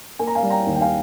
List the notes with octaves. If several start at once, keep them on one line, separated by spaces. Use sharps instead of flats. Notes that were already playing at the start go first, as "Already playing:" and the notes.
A#3 G#5
A#5
F5 G#5
G3
G5 A#5
D#2
G5
F5 G#5